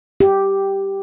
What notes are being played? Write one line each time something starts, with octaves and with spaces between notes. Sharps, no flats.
G4